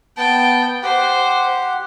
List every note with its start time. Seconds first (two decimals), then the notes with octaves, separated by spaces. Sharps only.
0.17 B3 G5 A5
0.83 G4 C5 F#5